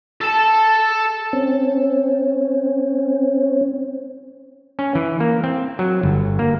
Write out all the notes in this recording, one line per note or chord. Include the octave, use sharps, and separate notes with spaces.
A4 A5
C4 C#4
C#4
E3
A#3
C4
F#3
G1
A#3